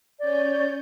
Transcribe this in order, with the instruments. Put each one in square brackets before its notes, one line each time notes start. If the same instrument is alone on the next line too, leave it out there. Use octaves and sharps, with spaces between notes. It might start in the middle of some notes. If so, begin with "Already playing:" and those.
[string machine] C#4 C#5 G6 [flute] D5